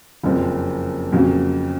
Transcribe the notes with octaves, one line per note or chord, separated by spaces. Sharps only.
F#1 F2 F3
F2 C#3 F#3 A#3